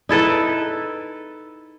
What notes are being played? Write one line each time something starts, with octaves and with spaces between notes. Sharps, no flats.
D#4 E4 A4 B4